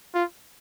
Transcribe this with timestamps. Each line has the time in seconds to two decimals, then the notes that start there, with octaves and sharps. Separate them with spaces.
0.15 F4